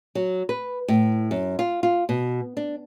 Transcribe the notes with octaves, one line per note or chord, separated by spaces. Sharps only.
F#3
B4
A2
F#2
F4
F4
B2
D4